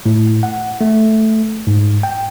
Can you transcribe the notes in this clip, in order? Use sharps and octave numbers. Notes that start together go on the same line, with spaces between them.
A2
F#5
A3
G#2
G5